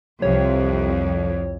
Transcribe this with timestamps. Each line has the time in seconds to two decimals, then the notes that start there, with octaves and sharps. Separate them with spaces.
0.22 C2 F2 C3 C#5